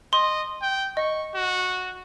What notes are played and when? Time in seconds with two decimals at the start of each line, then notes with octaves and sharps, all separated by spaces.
0.13 D#5 C6
0.62 G5
0.97 D#5 C#6
1.34 F#4